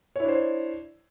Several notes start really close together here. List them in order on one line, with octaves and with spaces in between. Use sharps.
C#5 E4 D4 C5